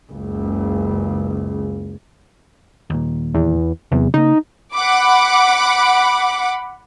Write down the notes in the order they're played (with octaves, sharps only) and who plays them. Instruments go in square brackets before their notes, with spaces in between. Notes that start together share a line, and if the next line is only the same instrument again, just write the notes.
[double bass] F#1 C#2
[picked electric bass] D#2 A#2
[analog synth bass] E2
[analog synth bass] E2 [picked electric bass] C3 F#3
[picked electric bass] C#3 A#3 [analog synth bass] D#4
[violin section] F#5 B5 D6